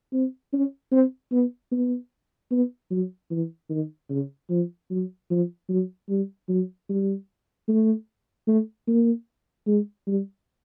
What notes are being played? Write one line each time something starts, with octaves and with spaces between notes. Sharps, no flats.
C4
C#4
C4
B3
B3
B3
F#3
E3
D#3
C#3
F3
F#3
F3
F#3
G3
F#3
G3
A3
A3
A#3
G#3
G3